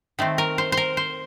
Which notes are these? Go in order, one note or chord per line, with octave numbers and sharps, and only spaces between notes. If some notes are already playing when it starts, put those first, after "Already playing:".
D#3 A3 C4
A#4
C5
C5
A#4
C5